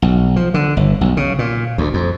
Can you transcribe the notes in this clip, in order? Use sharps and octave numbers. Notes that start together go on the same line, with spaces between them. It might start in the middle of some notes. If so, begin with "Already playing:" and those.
B1
F3
D3
G1
B1
C#3
A#2
D2
F2